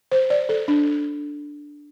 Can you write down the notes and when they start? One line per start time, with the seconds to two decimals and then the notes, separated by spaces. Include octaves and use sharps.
0.12 C5
0.30 D5
0.49 A4
0.68 D4